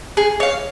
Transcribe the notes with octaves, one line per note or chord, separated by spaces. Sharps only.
G#4
C#5 F5